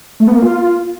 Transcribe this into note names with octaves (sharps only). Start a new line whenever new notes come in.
A3
B3
A#3
F4